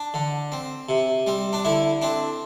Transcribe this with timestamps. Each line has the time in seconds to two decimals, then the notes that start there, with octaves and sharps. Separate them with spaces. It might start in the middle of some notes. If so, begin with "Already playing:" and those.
Already playing: D4
0.14 D3
0.52 C4
0.89 C3
1.27 G3 C4
1.53 D4
1.65 D3 E4
2.02 C4 D4